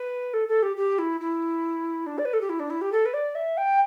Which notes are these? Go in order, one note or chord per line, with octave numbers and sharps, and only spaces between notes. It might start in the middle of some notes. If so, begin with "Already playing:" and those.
Already playing: B4
A4
A4
G4
G4
E4
E4
D4
D5
B4
A4
G4
E4
D4
E4
G4
A4
B4
D5
E5
G5